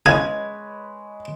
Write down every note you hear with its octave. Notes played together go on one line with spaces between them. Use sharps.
C#3 G#3 B4 C#5 G#5 G#6